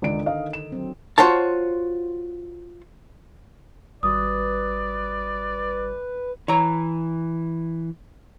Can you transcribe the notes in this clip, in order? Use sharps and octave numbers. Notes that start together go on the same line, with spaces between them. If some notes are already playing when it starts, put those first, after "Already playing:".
C#2 D3 D#3 D#4 D5 D7
D#5 F5
E7
F#3 C4
F4 F#4 C5 C#5 A5
G#1 G3 F#4 B4 D5 D#6
E3 C#5 A#5